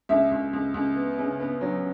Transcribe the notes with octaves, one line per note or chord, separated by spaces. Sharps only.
C#2 E5
C#2
C#2
C#2
B3
C#3
B3
F#3